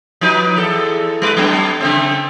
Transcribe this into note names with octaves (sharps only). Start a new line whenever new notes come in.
F3 D#4 B4
E2 A4
G3 B4
F#3 B3 D4
C#3 A3 C4